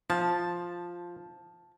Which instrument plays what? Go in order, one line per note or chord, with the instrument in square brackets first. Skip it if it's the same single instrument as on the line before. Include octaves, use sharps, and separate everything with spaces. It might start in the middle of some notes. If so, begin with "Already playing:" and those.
[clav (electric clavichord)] F3 [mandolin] A5